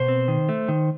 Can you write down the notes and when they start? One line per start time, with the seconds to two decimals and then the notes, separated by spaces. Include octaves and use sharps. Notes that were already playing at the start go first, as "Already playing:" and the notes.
Already playing: B2 C5
0.08 C4
0.28 D#3
0.49 A3
0.68 D#3